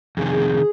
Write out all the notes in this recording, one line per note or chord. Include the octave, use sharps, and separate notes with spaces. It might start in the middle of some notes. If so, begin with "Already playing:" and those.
F2 C3 D#3 G#4